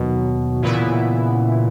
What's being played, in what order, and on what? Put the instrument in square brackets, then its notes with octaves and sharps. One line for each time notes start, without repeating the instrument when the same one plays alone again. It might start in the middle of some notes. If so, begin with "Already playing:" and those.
Already playing: [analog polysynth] D#2 D#3 F#3 [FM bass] B2
[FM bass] A#2 [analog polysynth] C#3 E3 B3 E4